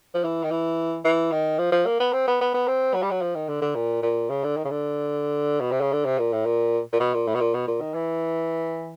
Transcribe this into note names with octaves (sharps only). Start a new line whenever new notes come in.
F3
E3
D#3
E3
E3
D#3
F3
F3
A#3
B3
C4
B3
B3
B3
C4
F#3
G3
F#3
F3
D#3
D3
D3
A#2
A#2
C#3
D3
D#3
C#3
D3
B2
C3
C#3
D3
C3
A#2
A2
A#2
A#2
B2
A#2
A2
B2
A#2
B2
A#2
D#3
E3